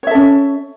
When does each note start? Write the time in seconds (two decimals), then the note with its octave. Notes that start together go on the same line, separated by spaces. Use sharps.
0.03 C#5
0.07 E5
0.11 A4
0.15 C#4